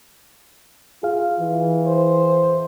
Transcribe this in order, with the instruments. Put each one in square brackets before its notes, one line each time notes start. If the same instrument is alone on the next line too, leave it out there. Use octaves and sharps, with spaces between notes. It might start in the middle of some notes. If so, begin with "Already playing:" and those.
[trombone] F4 [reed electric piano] G#4 F5
[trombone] E3
[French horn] C5